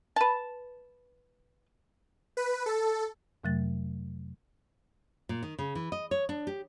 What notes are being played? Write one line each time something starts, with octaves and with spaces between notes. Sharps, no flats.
B4 A5
B4
A4
F2 C3 F#3 A3 A6
A#2
D#3
C#3
E3
D#5
C#5
D4
G4